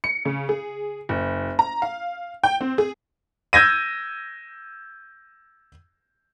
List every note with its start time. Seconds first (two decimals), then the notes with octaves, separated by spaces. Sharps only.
0.04 C#7
0.25 C#3
0.49 G#4
1.09 F#1
1.59 A#5
1.82 F5
2.43 G5
2.61 C4
2.78 G#4
3.53 E6 G6 G#6 A#6 D#7